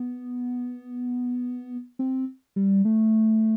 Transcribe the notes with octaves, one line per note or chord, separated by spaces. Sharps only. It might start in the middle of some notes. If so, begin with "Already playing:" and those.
Already playing: B3
C4
G3
A3